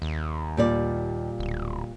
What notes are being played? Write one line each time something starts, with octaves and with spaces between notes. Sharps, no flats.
D#2
A#2 G3 D5
D1